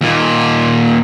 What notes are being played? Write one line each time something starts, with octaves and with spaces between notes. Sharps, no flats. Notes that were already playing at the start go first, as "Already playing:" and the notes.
D#2 A#2